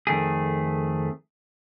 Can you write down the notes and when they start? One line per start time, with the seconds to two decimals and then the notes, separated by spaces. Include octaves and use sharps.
0.07 F2 D#3 A3 G#4